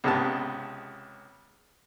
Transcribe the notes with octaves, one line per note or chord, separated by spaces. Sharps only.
C#2 G#2 C3 B3 A5